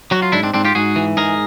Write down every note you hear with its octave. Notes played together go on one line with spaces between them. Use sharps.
F#3 F#4
F4
G#2 D4 E4
C4 D4
G#2 C4 D4
F4 G4
G#2 F#4 G#4
E3
G#2 G#4 A#4